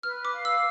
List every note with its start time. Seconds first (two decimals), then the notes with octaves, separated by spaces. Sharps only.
0.03 B4 F6
0.25 D6
0.35 F5
0.45 E6